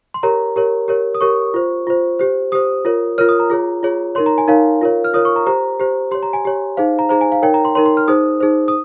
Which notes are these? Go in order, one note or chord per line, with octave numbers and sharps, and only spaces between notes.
C6
G4 A#4 C#5 A#5
G4 A#4 C#5
G4 A#4 C#5
D#6
G4 A#4 C#5 C#6
F4 C5
F4 C5
G4 C5
G4 C5 D#6
F4 A#4 C#5
F4 A#4 C#5 F6
D#6
A#5
F4 G#4 C#5
F4 G#4 C#5
D#4 A#4 C#5 C6
A#5
G#5
D#4 A#4 C#5 F5
F4 A#4 C#5
F6
F4 A#4 C#5 D#6
C#6
A#5
G4 C5 A#5
G4 C5
G4 C#5 C6
A#5
G#5
G4 C#5
D#4 G#4 C5 F5
A#5
D#4 G#4 C5 A#5
G#5
F5
D#4 A#4 C#5 G5
A#5
C6
D#4 A#4 C#5 C6
C6
F6
D#4 G#4 C5 D#6
D#4 G#4 C5
D#6